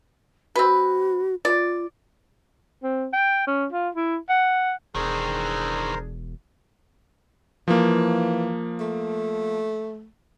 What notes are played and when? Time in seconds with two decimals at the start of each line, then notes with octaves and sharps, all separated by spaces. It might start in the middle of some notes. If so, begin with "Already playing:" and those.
0.56 C4 F#4 B4
1.45 F4 D5
2.83 C4
3.13 G5
3.47 C#4
3.72 F4
3.95 E4
4.29 F#5
4.95 E1 D#3 E3 D4 G#4 A#4 C5
7.68 E3 F3 A#3
8.80 A3